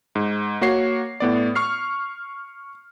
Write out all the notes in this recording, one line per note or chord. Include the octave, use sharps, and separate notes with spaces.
G#2
A#3 F#4 C#5 C7
A2 B3 D5
C#6 F6 C7